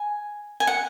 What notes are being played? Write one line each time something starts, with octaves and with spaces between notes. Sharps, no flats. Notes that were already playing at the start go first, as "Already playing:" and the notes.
Already playing: G#5
G#5
F#5